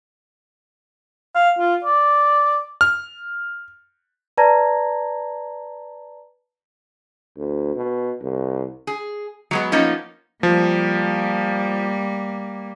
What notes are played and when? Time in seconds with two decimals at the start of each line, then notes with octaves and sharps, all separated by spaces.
1.35 F5
1.59 F4
1.84 D5
2.81 F6
4.38 B4 D5 A5 A#5 G#6 A#6
7.37 D2
7.76 B2
8.21 C2
8.87 G#4
9.51 F#3 G#3 B3
9.72 F3 A#3 B3 C#4 D#4
10.43 F3 G3 A#3